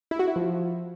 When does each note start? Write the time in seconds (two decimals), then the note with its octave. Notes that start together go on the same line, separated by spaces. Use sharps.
0.11 E4
0.19 F#4
0.28 E4
0.36 F3